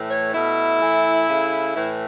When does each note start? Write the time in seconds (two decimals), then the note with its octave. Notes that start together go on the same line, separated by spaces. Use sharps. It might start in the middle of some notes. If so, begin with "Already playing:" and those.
Already playing: A2 E3 A3
0.09 C#5
0.33 B2 A3 E4
0.80 A2 E3 A3
1.29 C#3 A3
1.75 A2 E3 A3 E4